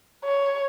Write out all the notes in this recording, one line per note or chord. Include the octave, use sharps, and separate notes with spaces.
C#5